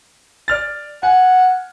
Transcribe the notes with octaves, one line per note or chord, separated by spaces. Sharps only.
D5 F6 A6
F#5 G#5